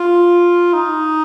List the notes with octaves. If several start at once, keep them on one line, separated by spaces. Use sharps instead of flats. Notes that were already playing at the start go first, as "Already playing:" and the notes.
Already playing: F4
D#4